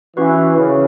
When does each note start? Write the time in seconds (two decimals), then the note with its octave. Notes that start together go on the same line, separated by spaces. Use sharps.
0.17 E3 C#4 F#4 B4
0.57 C#3